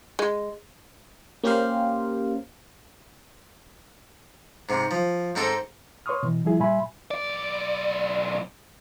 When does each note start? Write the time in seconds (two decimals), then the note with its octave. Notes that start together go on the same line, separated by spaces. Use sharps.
0.19 G#3
1.44 A#3 C#4 G4 A#4 C5 F5
4.69 G#2 C3
4.91 F3
5.36 G#2 C4 D#4 A4 A#5
6.06 B4 C#5 C6 C#6 D#6 F6
6.23 B2 E3
6.45 F3 G3 E4 G#4
6.60 A#2 G3 E5 G#5 B5 C6
7.11 B1 D5